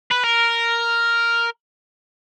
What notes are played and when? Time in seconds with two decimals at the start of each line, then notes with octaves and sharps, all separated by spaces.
0.11 B4
0.24 A#4